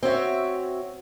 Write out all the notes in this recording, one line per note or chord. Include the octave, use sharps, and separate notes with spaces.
C4 F#4 C#5 E5